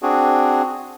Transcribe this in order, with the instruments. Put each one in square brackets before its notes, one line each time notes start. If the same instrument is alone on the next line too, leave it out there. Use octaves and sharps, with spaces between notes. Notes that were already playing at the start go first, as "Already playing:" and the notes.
[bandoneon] C4 D4 F#4 G#4